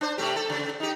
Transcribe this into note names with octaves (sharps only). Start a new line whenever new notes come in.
D4 C5
C3 A3 G4
A4
C#3
D#4 G4